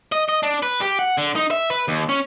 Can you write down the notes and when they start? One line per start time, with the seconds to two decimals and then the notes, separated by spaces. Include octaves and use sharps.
0.12 D#5
0.29 D#5
0.43 D4
0.63 B4
0.81 G4
0.99 F#5
1.18 D3
1.36 D#4
1.51 E5
1.70 B4
1.88 D#2
2.09 C#4